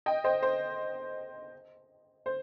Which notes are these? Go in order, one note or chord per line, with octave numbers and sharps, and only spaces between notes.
D#5 G5
C5 D#5
C5
C5